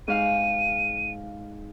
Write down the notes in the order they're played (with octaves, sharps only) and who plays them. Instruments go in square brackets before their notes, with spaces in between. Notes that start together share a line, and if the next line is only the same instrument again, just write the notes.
[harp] G#2 F5 [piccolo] D#7